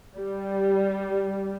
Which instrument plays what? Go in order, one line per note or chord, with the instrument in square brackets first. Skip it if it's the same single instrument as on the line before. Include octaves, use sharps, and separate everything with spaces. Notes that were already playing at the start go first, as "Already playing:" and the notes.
[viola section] G3